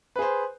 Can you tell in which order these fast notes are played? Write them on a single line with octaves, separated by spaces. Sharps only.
B4 G#4 C5